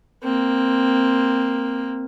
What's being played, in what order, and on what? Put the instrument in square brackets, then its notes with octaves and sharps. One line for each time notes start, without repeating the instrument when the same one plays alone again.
[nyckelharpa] A#3 C4